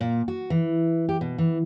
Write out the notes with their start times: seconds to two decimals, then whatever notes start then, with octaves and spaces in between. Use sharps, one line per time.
0.01 A#2
0.28 F#4
0.50 E3
1.09 G4
1.21 B2
1.38 E3